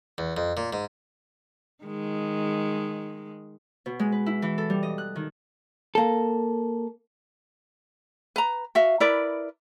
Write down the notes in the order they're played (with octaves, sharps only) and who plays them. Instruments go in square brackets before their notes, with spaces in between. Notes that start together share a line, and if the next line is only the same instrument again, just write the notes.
[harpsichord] E2
F2
A#2
G#2
[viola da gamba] D#3 G#3
[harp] B2
G#3
B4
E4
E3
A4
G3
D#5
F#6
D#3
[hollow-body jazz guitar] A#3 A4
[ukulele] B4 A#5
F#4 E5 F5
E4 A#4 B4 D5